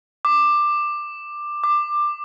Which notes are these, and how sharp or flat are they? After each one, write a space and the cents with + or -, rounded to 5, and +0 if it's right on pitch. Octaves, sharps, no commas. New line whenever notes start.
D6 +15
D6 +20